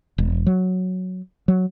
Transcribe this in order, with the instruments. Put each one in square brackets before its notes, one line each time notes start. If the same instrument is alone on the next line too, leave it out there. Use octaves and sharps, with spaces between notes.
[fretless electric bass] E1
F#3
F#3